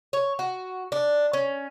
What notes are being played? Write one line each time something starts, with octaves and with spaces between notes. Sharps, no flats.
C#5
F#4
D4
C#4